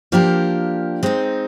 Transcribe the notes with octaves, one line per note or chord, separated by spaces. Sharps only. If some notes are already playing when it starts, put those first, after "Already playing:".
F3 A#3 D4 G4 A#4
G#3 C4 D#4